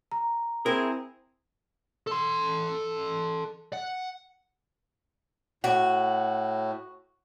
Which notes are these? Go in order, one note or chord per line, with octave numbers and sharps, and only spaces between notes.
A#5
C4 E4 G#4 A#4
A4 C6
F#5
A2 F#4